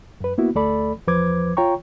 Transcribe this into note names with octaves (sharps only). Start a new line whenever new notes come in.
F#2 B4
A#3 B3 E4 F#4
D2 A3 A4 D5 B5
E2 F3 B4 C5 D6 G#6
F4 C#5 G5 A#5 C#6